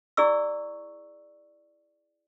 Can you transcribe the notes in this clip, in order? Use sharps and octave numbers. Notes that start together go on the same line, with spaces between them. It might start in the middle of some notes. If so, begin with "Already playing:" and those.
E4 G#4 D5 C#6 E6